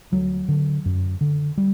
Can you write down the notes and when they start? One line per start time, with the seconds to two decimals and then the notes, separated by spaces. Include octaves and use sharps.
0.12 D2 F#3
0.48 D3
0.86 F#2
1.21 D3
1.58 G3